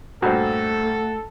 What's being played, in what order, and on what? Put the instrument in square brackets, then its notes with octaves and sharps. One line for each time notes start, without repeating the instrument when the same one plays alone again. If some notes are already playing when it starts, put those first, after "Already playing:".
[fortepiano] G2 A#2 C5 [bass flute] A3 [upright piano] F#4 [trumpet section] A4